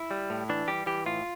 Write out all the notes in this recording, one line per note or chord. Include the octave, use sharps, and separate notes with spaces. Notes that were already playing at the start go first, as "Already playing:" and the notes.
Already playing: E4
G3
A2
E3 D4
G3 G4
E3 G4
A2 F4